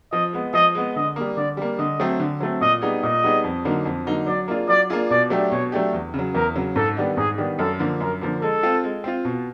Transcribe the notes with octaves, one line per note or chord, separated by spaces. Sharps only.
F3 D#5
G#3 B3
F3 D#5
G#3 B3
D3 D#5
G3 A#3
D3 D5
G3 A#3
D3 D#5
F#3 A3 C4
D3
F#3 A3 C4
A#2 D#5
G3 B3 D#4 G#4
A#2 D#5
G3 B3 D#4 G#4
F2
D3 F#3 A#3 D#4
F2
D3 F#3 A#3 D#4
F#3 D5
A#3 D4 F4 G#4
F#3 D5
A#3 D4 F4 G#4
B2 D5
F#3 A3 D4 G4
B2 C#5
F#3 A3 D4 G4
E2
C#3
F#3
E2 A#4
C#3 F#3
G#2 A4
D#3 G3 B3 D4
G#2 G#4
D#3 G3 B3 D4
F#2 A4
D3 F3 A#3
F#2 A#4
D3 F3 A#3
G#3 A4
C4 F4
G#3
C4 F4
B2